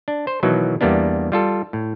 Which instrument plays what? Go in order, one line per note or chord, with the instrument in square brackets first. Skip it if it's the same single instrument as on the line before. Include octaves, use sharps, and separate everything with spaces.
[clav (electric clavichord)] D4
C5
B2 D#3 E3 F#3
E2 G3 A#3 B3 D4
G3 F4 A4
A2